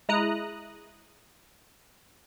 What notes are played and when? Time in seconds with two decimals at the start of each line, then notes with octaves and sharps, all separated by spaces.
0.09 G#3 E4 A#5 D#6 F#6